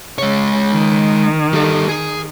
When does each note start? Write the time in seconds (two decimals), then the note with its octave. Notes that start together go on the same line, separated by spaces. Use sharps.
0.18 C#3 G#3 C#5
0.71 D#3
1.53 G3 A4
1.89 G#4